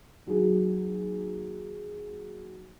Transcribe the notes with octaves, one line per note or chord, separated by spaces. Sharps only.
D#2 F#3 F#4 G#4